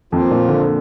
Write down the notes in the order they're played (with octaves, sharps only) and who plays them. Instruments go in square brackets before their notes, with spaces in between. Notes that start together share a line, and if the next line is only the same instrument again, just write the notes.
[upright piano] F2 [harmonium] F3 A#3 F4
[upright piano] A#2
D3